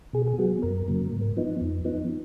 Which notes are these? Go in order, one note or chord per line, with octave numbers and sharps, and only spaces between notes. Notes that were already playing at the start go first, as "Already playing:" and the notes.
B2 G#4
G#4
F#3 B3 F#4
F#2 A#4
C#3 F#3 A#3
G#2
F3 B3 D#4
F2
F3 B3 D#4